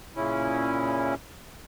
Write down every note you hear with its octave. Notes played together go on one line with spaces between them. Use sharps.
A#2 C#3 C#4 E4